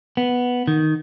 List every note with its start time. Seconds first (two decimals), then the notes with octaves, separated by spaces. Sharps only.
0.17 B3
0.67 D#3